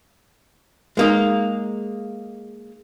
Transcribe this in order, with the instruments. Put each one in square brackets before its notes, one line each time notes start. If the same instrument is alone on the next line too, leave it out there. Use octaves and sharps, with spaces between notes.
[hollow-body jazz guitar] G#3 A#3 D#4